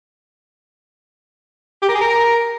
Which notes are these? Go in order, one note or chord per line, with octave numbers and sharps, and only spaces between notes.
G4
A#4
G#4
A#4